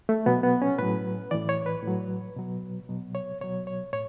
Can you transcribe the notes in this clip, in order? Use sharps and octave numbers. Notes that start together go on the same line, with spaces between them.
A3
B2 F#3 B3
B3
C#4
A2 F#3 B4
A2 E3 D5
C#5
B4
A2 F#3
B2 F#3
B2 F#3
C#5
B2 F#3 C#5
C#5
A2 C#5